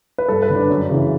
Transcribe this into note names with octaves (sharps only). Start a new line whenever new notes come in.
B4
G2 A4
B4
D3
D4
F#2 C#4
C#3 E3